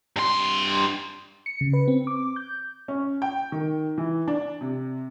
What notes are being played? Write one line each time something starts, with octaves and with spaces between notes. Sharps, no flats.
G2 C6
C#7
C#3
B4
C4
D6
G6
C#4
G5
D#3
E3
D4
C3